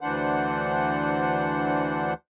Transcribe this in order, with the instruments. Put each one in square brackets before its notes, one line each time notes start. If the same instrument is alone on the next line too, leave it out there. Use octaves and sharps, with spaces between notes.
[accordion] D2 E3 D4 C5 F#5